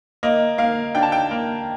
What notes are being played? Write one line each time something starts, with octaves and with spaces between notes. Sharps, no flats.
A#3 D#5
A#3 F5
D4 G5
A5
G5
A#3